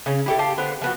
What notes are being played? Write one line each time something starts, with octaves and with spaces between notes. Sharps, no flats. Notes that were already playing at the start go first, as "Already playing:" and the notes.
C#3 C#4
E4 G4 A4
G4 F5 A5
D3 B3 C5
F3 B3 F#4